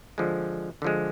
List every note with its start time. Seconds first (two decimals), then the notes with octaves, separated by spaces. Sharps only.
0.18 D3 F3 G#3
0.82 D3 F3 G#3